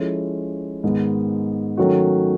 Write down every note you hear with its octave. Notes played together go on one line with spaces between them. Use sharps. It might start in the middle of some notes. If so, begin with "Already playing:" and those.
Already playing: F3 G#3 C#4 E4 A4
G#2 D#3 G#3 B3
D#3 F#3 A3 C#4 F#4